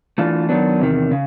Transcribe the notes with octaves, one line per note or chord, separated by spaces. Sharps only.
E3 A3 D4 F4
D#3 F#3 B3 D4
E2 C3 D#3
C#3